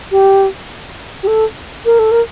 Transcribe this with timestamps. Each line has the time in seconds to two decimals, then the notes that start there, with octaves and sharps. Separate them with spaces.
0.11 G4
1.23 G4
1.27 A4
1.85 A#4
1.99 A4
2.11 A#4